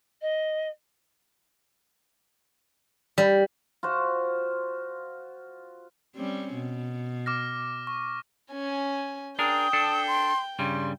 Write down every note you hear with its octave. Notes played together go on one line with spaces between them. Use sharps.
D#5
G3
F4 F#4 C5
G3 C4 C#4
B2
D6 F6 A#6
C#6
C#4 G#5
D4 G#4 A#4 G5 D#6
D4 A4
C6
G2 C#3 G3 C6